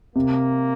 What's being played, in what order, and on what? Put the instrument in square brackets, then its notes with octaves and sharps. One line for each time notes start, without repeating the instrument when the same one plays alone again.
[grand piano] C3 [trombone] A#3